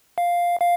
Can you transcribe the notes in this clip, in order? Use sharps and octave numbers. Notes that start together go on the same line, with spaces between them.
F5
F5